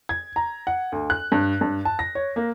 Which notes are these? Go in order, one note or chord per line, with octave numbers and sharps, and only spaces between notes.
G#6
A#5
F#5
D2
F#6
G2
G2
A5
A#6
C#5
A#3